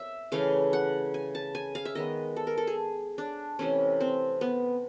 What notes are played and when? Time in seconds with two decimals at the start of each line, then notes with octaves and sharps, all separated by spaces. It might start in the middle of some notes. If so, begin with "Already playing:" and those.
Already playing: E5
0.32 C#3 E3 A3 F5
0.73 F#5
1.14 G#5
1.35 A5
1.55 G#5
1.75 F5
1.85 E5
1.95 D#3 G#3 B3 D#5
2.36 A4
2.47 A#4
2.58 A4
2.67 G#4
3.18 D4
3.59 C3 E3 A3 C#4
4.01 C4
4.41 B3